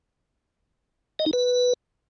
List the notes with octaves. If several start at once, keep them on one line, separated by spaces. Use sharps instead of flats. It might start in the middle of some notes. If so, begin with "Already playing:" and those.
D#5
D#4
B4